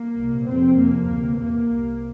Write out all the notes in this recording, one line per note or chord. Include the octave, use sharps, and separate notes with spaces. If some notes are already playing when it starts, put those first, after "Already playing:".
Already playing: A#3
C2 A#2
F2 C3 C4
F2 C3 A#3
D2 C3
E2 C3 A#3
C2 C3